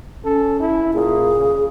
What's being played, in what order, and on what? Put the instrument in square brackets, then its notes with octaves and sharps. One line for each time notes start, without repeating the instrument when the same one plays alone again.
[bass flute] C#4 [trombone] A4
[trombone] E4
[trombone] A#2 [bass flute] G#4
[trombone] C#3